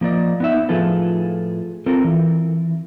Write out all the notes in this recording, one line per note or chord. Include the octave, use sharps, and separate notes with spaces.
F3 A#3 G4 D5 D#5
B3 D#4 E5
A2 F3 F4 G#4 A4 B4
C4 F4 A4 A#4
E3